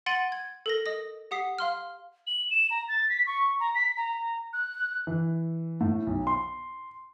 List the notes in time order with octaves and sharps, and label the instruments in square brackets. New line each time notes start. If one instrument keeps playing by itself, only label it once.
[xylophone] F#5 C6 A6 D7 D#7 F#7
G#6
A4 A#4 A#6
D#5 D#6 A#6
G4 F#5 D#6 B6 C7
F5 C6 F6
[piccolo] F#7
E7
A#5
A6
B6
C#6
A#5
B6
A#5
F#6
[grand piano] E3
A2
B1
C6